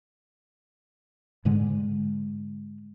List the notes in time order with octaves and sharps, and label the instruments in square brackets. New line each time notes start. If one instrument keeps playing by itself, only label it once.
[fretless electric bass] G#2 D3 G#3